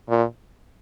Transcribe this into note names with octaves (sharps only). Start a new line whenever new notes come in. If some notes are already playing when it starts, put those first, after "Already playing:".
A#2